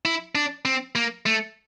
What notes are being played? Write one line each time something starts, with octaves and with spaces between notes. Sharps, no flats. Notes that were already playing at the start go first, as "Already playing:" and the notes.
E4
D4
C4
A#3
A3